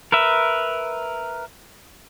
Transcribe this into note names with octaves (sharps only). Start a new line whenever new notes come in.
A#4 B4 E5